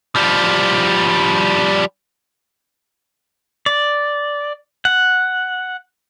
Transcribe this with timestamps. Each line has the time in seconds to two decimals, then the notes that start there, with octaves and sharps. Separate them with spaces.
0.16 F3 G3
3.66 D5
4.85 F#5